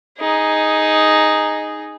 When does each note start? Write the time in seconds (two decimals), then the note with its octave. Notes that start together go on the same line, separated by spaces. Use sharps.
0.19 D#4 G#4